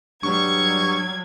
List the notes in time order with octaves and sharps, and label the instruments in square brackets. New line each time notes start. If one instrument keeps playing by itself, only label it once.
[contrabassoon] G2 [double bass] F#3 G3 [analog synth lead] C#6 [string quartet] G#6